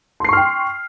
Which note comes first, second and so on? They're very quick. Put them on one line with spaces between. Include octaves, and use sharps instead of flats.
C6 C7 C#6 F6 G5